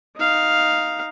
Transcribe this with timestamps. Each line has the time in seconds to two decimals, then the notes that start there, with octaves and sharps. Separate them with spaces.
0.17 D#4 F5